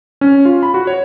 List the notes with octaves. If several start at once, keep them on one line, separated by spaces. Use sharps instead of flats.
C#4
F4
B5
F#4
C#5